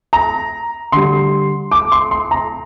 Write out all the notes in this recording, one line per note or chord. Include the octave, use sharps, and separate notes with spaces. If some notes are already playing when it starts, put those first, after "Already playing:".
A#5
D3 G3 C6
D6
C6
C6
A#5